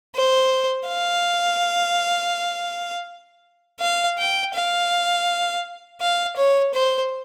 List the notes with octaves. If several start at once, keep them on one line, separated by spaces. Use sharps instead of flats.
C5
F5
F5
G5
F5
F5
C#5
C5